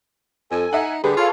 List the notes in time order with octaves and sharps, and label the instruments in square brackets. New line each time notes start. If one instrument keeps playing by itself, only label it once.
[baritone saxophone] F2 [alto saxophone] A4 [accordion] G#5
[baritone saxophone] D#4 [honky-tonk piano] E5 F#5
[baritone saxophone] D3 [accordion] G3 G4 [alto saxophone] G#4 [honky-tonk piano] B4
[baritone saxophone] F4 [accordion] A4 C#5 F5